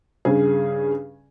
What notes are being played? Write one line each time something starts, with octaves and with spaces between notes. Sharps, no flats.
G2 C#3 G#4